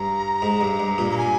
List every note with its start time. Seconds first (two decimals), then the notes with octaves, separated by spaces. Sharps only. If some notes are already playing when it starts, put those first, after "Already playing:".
Already playing: G2 A#5
0.42 G#2
0.61 G2
0.80 G2
0.98 G2 A#2
1.11 A#5
1.18 G#5